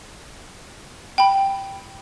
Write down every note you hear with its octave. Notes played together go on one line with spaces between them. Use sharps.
G5 B5